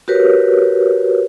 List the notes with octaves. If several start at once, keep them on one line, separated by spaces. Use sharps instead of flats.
F#4 G4 A#4 B4 C#5